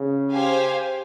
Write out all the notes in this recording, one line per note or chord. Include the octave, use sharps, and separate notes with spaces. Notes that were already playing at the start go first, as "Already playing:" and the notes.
Already playing: C#3
G4 C5 F5 G#5